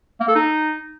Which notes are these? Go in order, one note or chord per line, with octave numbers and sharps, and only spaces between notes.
A#3
A4
D#4